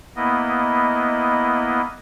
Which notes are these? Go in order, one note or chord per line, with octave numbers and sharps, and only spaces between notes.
A#3 B3 E4 D#5